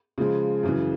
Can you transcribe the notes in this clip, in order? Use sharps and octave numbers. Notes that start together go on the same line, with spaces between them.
C#3 F3 G#3
F#2 C#3 E3